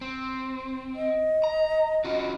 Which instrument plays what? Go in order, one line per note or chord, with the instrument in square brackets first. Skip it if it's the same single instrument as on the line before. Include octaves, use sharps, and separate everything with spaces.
[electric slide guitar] C4
[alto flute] D#5
[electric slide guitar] A#5
C#4 F4 F#4